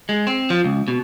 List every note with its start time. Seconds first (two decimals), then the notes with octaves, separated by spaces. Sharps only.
0.09 G#3
0.27 C4
0.50 F3
0.64 C#2
0.88 B2